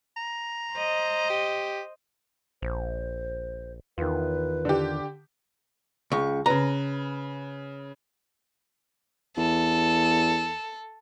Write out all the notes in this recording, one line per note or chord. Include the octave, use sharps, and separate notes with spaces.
A#5
C5 D#5
G4
A#1 C5
E2 D#3 F4 B4
D3 G4
C#2 C#6
C#3 B4 A#5
E2 A4